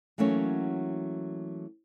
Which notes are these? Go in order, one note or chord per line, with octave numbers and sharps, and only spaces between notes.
E3 F#3 A3 A#3 C#4 F#4